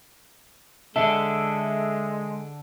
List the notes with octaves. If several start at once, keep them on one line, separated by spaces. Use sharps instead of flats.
D3 G#3 D4 A4 E5